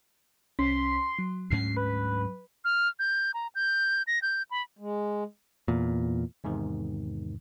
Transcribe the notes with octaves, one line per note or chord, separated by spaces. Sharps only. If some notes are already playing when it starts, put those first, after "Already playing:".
C2 C#4 C6 B6
F#3
D2 G#2 C#4 C7
B4
F6
G6
A#5
G6
A#6
G6
B5
G#3
E2 A#2
E2 G#2 C3 D#3